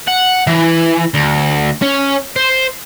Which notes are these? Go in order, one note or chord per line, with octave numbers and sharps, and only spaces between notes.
F#5
E3
D2
C#4
C5